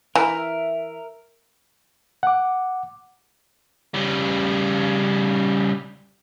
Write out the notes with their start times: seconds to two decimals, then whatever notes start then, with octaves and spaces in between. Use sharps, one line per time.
0.15 E3 A#4 E5
2.23 F#5 D6
3.94 C#3 G3